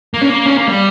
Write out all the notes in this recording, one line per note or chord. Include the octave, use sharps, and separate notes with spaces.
A#3
C#4
A#3
C#4
A#3
G3